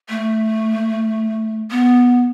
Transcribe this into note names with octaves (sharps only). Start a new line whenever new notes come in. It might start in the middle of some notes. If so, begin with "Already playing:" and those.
A3
B3